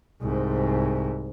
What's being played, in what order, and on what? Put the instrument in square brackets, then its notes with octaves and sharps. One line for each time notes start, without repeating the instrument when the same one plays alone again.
[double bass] C2 G#2